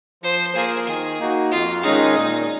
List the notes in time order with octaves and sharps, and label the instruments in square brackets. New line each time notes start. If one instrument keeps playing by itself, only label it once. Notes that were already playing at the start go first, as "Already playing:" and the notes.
[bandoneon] F3 [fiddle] C5
[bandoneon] A#3 F4 A#4 [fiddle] G#4
[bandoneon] D#3 [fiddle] G#4
[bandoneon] A#3 D#4 F#4
[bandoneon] F2 [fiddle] F4
[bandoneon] D#3 G#3 C#4 G#4 [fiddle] D#4
[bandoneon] A#2